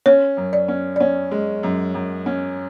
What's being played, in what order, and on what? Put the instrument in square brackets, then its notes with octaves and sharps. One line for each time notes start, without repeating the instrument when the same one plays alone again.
[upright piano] C#4 [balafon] C#5
[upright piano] F#2
[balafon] D5
[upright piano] C#4
[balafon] D5
[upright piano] C#4 [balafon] C#5
[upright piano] G#3
F#2
F#2
C#4